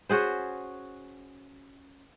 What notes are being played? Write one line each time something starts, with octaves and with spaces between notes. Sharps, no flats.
C#4 F#4 G#4 C5